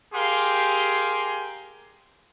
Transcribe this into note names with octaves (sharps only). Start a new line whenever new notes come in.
G4 G#4 A#4 F5 C6